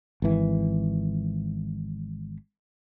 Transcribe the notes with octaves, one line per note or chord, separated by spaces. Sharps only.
G#1 E3